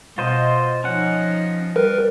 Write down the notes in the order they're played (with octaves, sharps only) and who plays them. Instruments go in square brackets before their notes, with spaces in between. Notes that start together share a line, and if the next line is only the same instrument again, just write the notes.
[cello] B2 [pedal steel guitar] F4 C5 D#5
[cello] F3 D#4 [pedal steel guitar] C#4 F#5
[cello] G3 [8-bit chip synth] A#4 B4